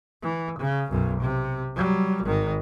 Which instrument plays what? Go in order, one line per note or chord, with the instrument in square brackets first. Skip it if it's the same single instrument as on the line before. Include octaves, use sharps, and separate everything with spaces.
[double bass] E3
C#3
B1 F#2
C3
F#3 G3
G#1 D#3